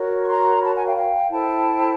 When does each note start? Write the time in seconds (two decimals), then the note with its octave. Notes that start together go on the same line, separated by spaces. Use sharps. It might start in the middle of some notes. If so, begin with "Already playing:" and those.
Already playing: F#4 A#4 C#5
0.23 C#6
0.28 A#5 C6
0.62 A5 B5
0.74 F#5 G#5
0.85 F5 G5
0.97 F5 G5
1.31 E4 A4 C5 G5 A5